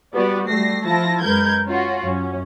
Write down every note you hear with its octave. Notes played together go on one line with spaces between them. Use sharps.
G3 B3 F#4 G4 B4 D5
G3 A3 A#6 C7
F3 E4 F4 A5 A#6
F#2 G#3 A#4 B4 G6 G#6
C#4 F4 F#4
F#2 C#4